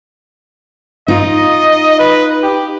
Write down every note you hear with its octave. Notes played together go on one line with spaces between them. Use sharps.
D#4 F4 D#5
B4
G4